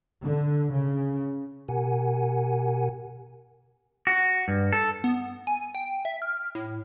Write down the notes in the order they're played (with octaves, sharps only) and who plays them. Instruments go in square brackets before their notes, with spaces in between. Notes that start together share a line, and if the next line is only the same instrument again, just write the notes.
[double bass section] D3
C#3
[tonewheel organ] B2 G4 A#4 F#5 G#5
[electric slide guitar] F#4
G2
A4
[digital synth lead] B3
G#5
G5
E5
F6
A2